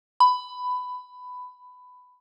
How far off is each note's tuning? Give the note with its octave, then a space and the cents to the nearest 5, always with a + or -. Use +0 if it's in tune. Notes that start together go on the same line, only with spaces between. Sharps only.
B5 +15